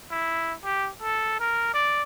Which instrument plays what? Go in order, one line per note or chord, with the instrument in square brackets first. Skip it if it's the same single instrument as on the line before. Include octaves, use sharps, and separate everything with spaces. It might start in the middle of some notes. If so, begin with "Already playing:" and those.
[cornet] E4
G4
A4
A#4
D5